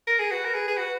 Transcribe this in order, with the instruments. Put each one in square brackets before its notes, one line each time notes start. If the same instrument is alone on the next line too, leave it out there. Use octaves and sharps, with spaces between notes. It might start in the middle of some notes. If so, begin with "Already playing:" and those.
[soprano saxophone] A#4
G#4
[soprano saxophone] F#4 [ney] B4
[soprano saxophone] A#4
G#4
G#4
F#4